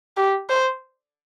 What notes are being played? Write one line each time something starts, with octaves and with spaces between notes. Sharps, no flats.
G4
C5